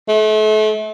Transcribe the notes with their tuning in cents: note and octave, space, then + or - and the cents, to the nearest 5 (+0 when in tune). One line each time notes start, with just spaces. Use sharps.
A3 -35